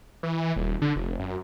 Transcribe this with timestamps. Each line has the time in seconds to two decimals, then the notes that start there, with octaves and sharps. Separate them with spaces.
0.23 E3
0.56 D#1
0.82 D3
0.96 F1
1.19 F#2